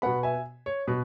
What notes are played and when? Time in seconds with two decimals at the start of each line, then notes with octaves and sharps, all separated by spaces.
0.02 B2 B3 F#5 B5
0.23 E5 G#5
0.66 C#5
0.87 B2 B4